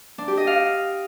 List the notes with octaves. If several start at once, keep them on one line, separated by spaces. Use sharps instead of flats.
D4
G4
D#5
F5